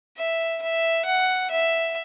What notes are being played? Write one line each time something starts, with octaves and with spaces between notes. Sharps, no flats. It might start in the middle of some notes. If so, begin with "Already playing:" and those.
E5
E5
F#5
E5